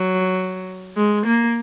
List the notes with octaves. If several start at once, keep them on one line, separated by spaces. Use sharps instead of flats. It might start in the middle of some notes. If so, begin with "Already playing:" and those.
Already playing: F#3
G#3
A#3